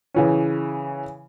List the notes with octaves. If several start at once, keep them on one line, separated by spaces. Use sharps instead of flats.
C#3 E3 C#4